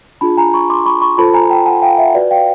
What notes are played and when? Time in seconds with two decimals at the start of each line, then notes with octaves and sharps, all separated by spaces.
0.21 D4 F4 G#4 A5 B5
0.37 G#5 A#5
0.53 B5 C#6
0.70 C6 D6
0.86 B5 C#6
1.01 B5 C#6
1.18 F4 A4 C5 A5 B5
1.34 G#5 A#5
1.50 G5 A5
1.66 F#5 G#5
1.82 F5 G5
1.98 E5 F#5
2.14 F#4 B4 D5
2.31 F5 G5